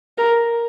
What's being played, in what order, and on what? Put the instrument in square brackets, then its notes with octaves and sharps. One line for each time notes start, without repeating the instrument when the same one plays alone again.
[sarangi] A#4